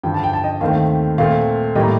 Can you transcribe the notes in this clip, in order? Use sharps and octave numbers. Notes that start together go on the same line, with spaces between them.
G2 D3 F3 G5
A5
G5
A5
D#5 G5
D#2 D#3 A3 C4 F5
A#2 A3 C4 F5
A2 G3 A#3 D#5 G5
A#5